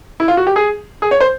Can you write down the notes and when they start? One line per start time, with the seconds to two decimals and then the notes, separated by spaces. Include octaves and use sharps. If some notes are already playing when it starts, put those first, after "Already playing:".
0.20 E4
0.28 F4
0.37 F#4
0.47 G4
0.56 G#4
1.02 G#4
1.11 C#5
1.21 C5